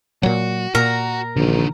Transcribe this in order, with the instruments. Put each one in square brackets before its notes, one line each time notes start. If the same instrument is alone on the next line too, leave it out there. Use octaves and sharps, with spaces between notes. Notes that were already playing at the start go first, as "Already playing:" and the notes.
[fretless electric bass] A#2 F#3 [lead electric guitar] F#4
[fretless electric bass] A#2 [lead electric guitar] F#4 [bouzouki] A#4
[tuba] A#1 [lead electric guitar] D3 D#3